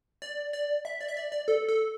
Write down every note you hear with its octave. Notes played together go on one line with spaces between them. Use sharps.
D5
D5
E5
D5
E5
D5
D5
A4
A4